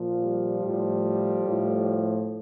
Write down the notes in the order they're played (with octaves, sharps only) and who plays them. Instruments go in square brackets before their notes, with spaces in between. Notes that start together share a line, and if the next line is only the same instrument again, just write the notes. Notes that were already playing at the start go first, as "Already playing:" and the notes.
Already playing: [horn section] A#2 F3
G3
A2 F3
A2 F3